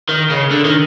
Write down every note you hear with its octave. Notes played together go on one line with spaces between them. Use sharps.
D#3
C#3
D3
D#3